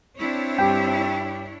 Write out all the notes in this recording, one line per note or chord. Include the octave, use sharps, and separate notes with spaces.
C4 D4 E4 C#5
G2 G4 G5